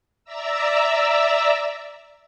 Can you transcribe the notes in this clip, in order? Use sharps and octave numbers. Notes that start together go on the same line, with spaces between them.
D5 E5 A#5 E6